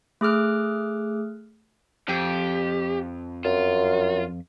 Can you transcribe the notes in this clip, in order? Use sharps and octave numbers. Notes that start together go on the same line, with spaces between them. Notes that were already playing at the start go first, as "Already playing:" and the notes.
A3 G#4 D6 F6 F#6
F2 G4
F#2 F4